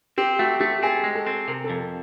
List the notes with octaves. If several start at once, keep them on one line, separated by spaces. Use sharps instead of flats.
C4 G4
A3 F#4
A3 G4
C4 G#4
G#3
A4
C4
C3 A#4
A4
F2